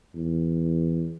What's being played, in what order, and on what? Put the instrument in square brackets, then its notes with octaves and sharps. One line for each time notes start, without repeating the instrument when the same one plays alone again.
[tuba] E2